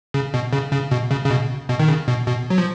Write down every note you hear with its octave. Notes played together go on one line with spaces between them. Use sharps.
C#3
B2
C#3
C#3
B2
C#3
C#3
B2
B2
D#3
C#3
B2
B2
F#3
F3